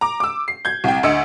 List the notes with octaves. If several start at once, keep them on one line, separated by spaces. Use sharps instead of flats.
A#5 D6
D6 E6
C7
G6 G#6
C2 G5
D2 D#5 E6 C#7